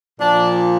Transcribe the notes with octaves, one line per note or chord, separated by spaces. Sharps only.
A#2 F3 D4